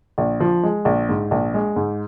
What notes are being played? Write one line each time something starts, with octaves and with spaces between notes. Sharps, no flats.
A#1
F3
G#3
A#1
G#2
A#1
G#3
G#2